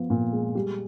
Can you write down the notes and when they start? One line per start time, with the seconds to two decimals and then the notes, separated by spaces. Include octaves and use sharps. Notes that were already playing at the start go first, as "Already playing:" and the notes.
Already playing: F3 B3
0.10 A#2
0.33 G#3
0.55 G3